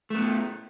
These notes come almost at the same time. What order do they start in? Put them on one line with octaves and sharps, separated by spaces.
A3 B3 A2